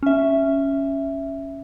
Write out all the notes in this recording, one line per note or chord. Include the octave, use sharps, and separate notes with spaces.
C#4 E5